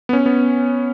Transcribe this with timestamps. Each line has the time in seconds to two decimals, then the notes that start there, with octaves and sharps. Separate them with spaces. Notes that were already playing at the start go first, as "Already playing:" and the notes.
0.09 B3
0.13 C#4
0.26 B3